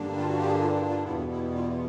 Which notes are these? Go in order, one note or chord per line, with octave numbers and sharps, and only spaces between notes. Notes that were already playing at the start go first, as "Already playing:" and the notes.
Already playing: G2 D3 G3 A#3 D4
F4
F#4
G4
G#4
F4
E4
F4
E2 B2 G3 B3 E4
E4
F4
E4